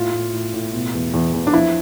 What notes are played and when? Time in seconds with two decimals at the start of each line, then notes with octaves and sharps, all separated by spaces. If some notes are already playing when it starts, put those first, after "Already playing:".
Already playing: A2 F4
0.13 A2
0.33 A2
0.54 A2
0.73 B2
0.94 E2
1.14 E2
1.33 E2
1.47 D4
1.53 F3 E4